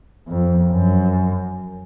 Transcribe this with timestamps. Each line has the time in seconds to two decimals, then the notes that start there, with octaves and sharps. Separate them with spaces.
0.28 F2
0.71 F#2